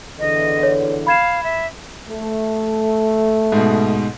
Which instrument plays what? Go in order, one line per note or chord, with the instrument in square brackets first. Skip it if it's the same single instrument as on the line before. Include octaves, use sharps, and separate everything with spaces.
[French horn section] E2 D3 E3 [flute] D#5
[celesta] C#5
[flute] F5 [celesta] B5 G#6 E7
[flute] E5
[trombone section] A3
[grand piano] G#2 B2